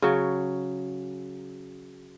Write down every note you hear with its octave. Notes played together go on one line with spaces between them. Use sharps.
C#3 F#3